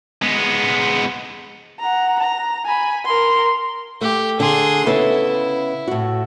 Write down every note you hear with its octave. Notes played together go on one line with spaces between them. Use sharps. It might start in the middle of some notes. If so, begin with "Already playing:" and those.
G#3 B3
F#5 A#5
A#5
G#5 B5
A#4 C6
A3 G4
D3 G#4 C6
C#3 B3 E4 A4
A2 F#4